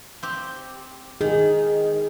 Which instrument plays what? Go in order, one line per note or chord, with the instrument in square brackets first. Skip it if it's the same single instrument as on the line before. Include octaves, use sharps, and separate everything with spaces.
[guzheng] C4 G4
[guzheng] D#3 [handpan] G#4